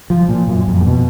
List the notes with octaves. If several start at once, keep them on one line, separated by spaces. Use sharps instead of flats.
F3
A#2
F#2
F2
A#2
B2